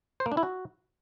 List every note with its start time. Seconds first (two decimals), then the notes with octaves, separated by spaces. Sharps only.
0.20 C5
0.26 A#3
0.32 D4
0.37 E4
0.43 F#4